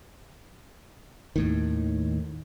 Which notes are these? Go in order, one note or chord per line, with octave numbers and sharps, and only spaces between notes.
D#2 A2 D#3